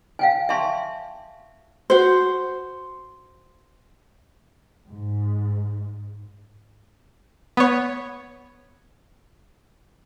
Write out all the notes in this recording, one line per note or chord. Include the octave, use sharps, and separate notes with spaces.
F5 G5 G#5
E5 G#5 A5 C6 C#6
F#4 C5
G#2
B3 C#5